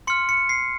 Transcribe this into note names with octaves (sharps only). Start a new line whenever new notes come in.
C6 F6 C#7
C#7
C7